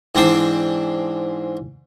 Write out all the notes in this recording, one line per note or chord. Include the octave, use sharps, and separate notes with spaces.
G#2 E3 C4 D4 C5 G5